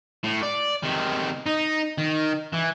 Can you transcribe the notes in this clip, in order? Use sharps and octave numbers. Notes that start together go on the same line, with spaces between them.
A2
D5
C3 D#3
D#4
D#3
E3